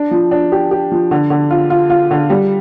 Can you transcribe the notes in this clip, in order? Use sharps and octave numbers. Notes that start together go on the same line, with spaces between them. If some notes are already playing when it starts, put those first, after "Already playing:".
Already playing: D4
F3
D4
G4
G4
F3
D3
D3
F4
F4
F4
D3
G3